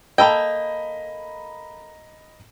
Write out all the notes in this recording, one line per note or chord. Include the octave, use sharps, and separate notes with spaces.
A#3 A4 D#5 G5 A#5 B5